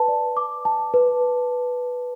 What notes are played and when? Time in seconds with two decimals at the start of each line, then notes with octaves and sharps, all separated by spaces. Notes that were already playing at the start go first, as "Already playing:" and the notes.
Already playing: B4 A5
0.08 D5
0.37 D6
0.65 A5
0.94 B4